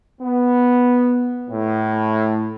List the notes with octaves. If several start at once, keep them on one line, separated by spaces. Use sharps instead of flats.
B3
A2